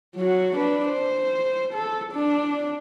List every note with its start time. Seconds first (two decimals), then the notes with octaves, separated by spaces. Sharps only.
0.16 F#3 F#4
0.56 D4 B4
0.89 C5
1.74 A4
2.13 D4